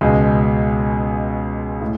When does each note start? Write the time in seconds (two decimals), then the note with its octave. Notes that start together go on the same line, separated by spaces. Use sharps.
0.01 C#2 B2 G#3
1.81 A2